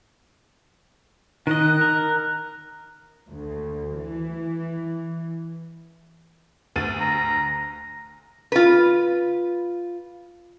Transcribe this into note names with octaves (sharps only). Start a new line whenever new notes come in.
D#3 D#5 F#6
A#4
D2
E3
D2 A6 D#7
A#5
F4 B4